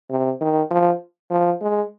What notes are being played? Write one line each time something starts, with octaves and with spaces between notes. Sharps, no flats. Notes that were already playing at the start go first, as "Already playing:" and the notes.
C3
D#3
F3
F3
G#3